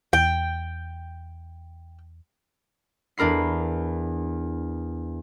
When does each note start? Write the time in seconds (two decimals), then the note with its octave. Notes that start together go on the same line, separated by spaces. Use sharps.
0.13 E2 G5
3.18 E2 D4 A#4 B5 C7